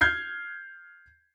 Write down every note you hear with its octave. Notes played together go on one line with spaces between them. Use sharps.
F6 G6 G#6 C7